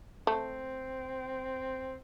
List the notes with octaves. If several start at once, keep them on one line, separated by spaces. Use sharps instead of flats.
A3 C4